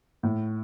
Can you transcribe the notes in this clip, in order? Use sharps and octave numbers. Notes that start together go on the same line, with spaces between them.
A2